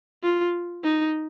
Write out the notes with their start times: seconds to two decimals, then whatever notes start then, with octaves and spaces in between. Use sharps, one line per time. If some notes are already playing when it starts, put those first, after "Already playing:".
0.23 F4
0.83 D#4